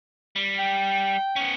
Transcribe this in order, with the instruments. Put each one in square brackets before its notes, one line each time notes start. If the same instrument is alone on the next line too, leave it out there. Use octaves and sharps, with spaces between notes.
[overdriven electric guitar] G3
[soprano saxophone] G5
[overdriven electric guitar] B3 C#4